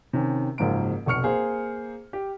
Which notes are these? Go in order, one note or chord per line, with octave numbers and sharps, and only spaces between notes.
C3 D#3 C#4
F#1 G#2 F3 A#3 D7
F1 B1 C#6 F6 C#7
A#3 G#4 C5
G4